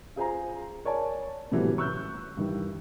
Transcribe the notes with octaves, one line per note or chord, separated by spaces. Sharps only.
F4 G#4 C5 G#5 A#5
A#4 C#5 D5 G#5 A5
A2 C3 E3 F#3 G3 B3
C#6 E6 F#6 G6
G2 D#3 E3